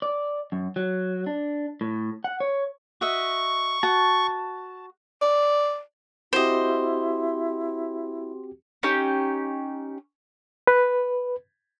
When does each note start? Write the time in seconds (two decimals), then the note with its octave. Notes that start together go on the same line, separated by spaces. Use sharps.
0.02 D5
0.52 F#2
0.76 F#3
1.27 D4
1.81 A2
2.24 F#5
2.40 C#5
3.01 F#4 D#5 E5 C#6
3.83 F#4 A5
5.22 D5
6.33 C4 E4 F#4 G4 C5 D#5
8.83 C#4 D#4 G4
10.67 B4